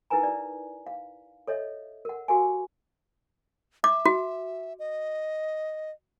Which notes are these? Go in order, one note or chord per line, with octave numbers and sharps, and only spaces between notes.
D#4 E4 A#4 B4 G#5 A#5
E4 G4 D5
F5
A4 C#5 D#5 E5
A#4 F#5
F#4 G4 A#4 F5 G#5
E5 D6
F#4
D#5